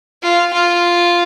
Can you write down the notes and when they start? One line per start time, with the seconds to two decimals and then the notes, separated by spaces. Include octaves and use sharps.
0.23 F4
0.53 F4